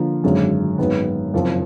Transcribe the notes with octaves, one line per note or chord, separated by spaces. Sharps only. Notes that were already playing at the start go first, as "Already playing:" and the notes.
Already playing: D3 F3 A#3
G#1 F#2 D3 G#3
G#1 F#2 D#3 G#3 B3
F#1 F2 F3